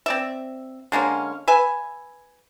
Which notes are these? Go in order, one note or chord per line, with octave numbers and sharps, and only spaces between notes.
C4 D5 E5
D3 G#3 A#3 C#4
B4 E5 G#5